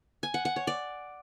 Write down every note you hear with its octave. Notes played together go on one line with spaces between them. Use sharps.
G#5
F#5
F#5
C#5
D5